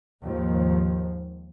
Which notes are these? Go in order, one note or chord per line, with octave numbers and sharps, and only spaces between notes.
D#2 G#2 F3